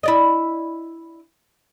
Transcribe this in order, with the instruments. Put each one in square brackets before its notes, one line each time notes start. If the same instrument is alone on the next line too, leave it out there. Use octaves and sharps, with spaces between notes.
[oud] E4 D5 D#5